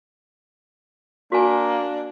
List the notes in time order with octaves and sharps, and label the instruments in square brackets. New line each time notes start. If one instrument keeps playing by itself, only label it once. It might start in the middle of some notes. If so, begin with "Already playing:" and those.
[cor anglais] A#3 [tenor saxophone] D4 [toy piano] F#4 G#5